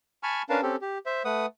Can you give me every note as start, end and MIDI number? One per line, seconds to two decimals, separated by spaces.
0.23 0.42 80
0.23 0.42 81
0.23 0.42 83
0.23 0.42 85
0.23 0.42 89
0.49 0.61 61
0.49 0.61 62
0.49 0.61 70
0.49 0.61 71
0.49 0.61 77
0.49 0.61 81
0.63 0.76 60
0.63 0.76 61
0.63 0.76 67
0.63 0.76 69
0.82 0.98 67
1.06 1.23 72
1.06 1.23 76
1.25 1.46 57
1.25 1.46 71
1.25 1.46 78
1.25 1.46 87